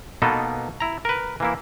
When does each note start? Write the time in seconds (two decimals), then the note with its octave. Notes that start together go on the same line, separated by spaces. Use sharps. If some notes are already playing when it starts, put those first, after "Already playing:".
0.22 B2 A#3 B3 D#4 A4
0.80 E4 A#5
1.05 A#4 B4
1.40 E3 A#3 E4